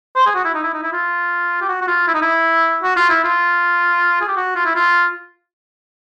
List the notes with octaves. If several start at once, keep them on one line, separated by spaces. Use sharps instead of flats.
C5
G#4
F#4
E4
D#4
E4
D#4
E4
F4
G4
F#4
F#4
F4
E4
D#4
E4
F#4
F4
E4
F4
G#4
G4
F#4
F4
E4
F4